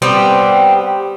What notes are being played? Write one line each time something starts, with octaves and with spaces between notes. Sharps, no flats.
G3 B3 C4